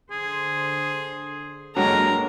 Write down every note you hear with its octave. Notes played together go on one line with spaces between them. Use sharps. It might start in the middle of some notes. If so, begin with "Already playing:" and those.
D3 G#4 C5
G2 D3 F#3 G#3 A#3 A#4 A#5